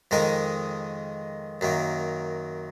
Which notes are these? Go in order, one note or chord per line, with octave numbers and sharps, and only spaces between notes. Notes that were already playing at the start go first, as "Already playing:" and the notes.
F2 D#3 G#3 D#4 A#4
F#2 D#3 A#3